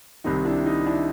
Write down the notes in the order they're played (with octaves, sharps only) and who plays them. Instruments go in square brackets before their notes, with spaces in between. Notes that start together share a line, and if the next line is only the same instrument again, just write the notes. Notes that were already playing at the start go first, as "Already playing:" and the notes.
[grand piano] C2 C3 D#3 D#4
D4 E4
D#4
D4 E4